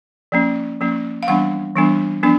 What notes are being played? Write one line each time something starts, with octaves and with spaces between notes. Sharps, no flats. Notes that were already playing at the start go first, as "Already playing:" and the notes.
F3 A#3 C#4
F3 A#3 C#4
F5
E3 G3 B3 D4 F#5
E3 G3 B3 D4
F3 B3 D4